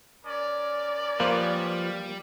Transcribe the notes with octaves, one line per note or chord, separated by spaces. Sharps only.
C#4 A#4 D5
F3 G3 A#3 G4 B4 C5